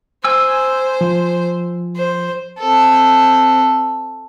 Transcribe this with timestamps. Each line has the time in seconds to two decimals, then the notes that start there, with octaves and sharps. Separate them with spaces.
0.25 C5 G#5 E6
1.01 F3
1.96 C5
2.59 C4 A4